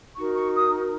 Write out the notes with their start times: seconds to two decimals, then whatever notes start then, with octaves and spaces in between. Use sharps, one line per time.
0.16 D#4 F#4 A#4 C#6
0.35 C#6
0.56 D#6